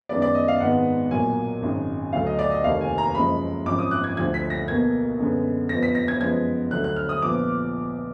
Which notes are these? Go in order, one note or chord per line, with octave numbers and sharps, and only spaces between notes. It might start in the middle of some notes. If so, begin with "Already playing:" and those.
F#2 D#3 G#3 B3 D5
D5
D#5
F5
G#1 G#2 D#3 G#3 B3 F#5
B1 A#2 F#3 A#3 G#5
G#1 F#2 D#3 G#3
D2 D3 F#3 F5
D#5
D5
D#5
F1 D#2 D#3 A#3 F5
G#5
A#5
F#1 F#2 F3 G#3 B5
G#1 F#2 F3 D6
D#6
F#6
G#6
D2 D3 F3 G#6
B6
A#6
B1 B2 A#3 G#6
F#2 D3 G#3 B3
F2 F3 B3 A#6
B6
A#6
G#6
F#2 F3 G#3 B3 G#6
D2 D3 F#3 F#6
F#6
F6
D#6
A#1 F3 B3 D6